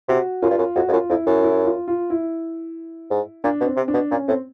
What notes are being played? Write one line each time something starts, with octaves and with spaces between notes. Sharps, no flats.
C3 F#4
F#2 F4
G2
F#2
F2 F#4
F2
F#2 F4
F2 E4
F#2 E4
E4
F4
F4
E4
G#2
A#2 D4
B2
C4
C3
D4
B2
A#2 C#4
A2 C4